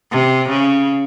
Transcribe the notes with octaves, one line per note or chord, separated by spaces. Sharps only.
C3
C#3